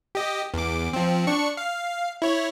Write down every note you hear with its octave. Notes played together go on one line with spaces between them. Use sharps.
G4 D#5
E2 D6
F3 C4
D4 C#6 C#7
F5
E4 C#5